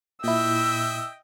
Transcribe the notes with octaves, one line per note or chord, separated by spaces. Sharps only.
A#2 E4 D#5 E5 G5 E6